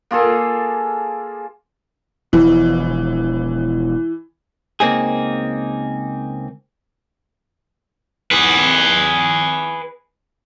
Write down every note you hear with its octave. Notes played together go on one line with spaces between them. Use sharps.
A#3 F4 G#4 A4
E1 E3 F3
C#2 A#3 C4 D#4 G#4
G#4 B4